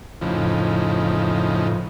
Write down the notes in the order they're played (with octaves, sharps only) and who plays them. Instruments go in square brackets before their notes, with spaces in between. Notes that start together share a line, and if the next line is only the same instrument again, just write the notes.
[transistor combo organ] F2 A2 C#3 E3 F3 D#4